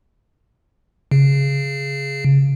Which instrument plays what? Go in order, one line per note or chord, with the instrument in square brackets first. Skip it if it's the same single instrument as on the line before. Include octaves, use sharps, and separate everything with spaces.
[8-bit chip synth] C#3